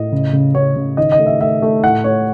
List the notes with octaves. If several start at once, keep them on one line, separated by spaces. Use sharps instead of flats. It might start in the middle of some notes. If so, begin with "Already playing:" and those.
Already playing: A2 D#5
C#3
C#3
C#3 C#5
C#3
D#3 D#5
D#5
A3
E5
A3 E5
A3
A2 F#5
A3 C#5